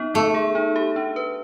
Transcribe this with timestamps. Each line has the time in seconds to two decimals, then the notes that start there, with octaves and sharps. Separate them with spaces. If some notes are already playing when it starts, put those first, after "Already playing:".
Already playing: B3 D#4
0.14 A3 B3
0.35 G#4
0.55 D#4
0.76 G4
0.96 D4
1.16 B4